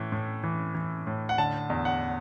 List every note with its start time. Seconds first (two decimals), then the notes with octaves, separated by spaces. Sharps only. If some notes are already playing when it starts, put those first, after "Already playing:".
Already playing: A2 E3
0.12 A2
0.44 E3
0.75 E3
1.07 A2
1.29 F#5
1.38 D3 A5
1.70 E2
1.85 F#5